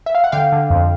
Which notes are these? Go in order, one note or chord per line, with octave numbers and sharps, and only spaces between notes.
E5
F5
F#5
D3 F5 G5
D3
F2